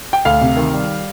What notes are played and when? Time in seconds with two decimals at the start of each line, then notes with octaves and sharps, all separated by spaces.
0.13 G5
0.25 D2 F5
0.41 C3
0.57 D#3
0.73 G3